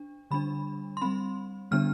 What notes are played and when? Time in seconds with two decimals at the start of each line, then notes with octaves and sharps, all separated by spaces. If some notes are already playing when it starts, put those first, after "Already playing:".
Already playing: D4
0.31 D3 G3 D4 B5
0.97 C6
1.01 G3 C4 B5
1.71 D3 G3 B3 D4 F6